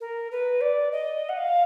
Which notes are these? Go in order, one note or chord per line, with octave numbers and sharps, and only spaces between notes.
A#4
B4
D5
D#5
F#5
F5